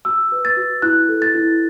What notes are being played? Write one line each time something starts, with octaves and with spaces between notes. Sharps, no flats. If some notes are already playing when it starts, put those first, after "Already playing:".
F#4 E6
B4
A6
F#4
E4 F#6
A4
A6
E4